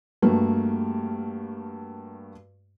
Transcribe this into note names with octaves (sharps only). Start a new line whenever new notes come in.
G2 A3 A#3 F#4